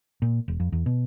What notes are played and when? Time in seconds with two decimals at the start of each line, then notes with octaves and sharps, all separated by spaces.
0.22 A#2
0.48 E1
0.60 F2
0.72 E2
0.86 B2